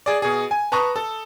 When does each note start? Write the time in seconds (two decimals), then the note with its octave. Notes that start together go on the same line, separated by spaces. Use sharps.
0.06 G#4 D5
0.22 B2 G#4
0.51 G#5
0.72 B4 A5 A#5 C#6 D#6 F#6
0.96 A4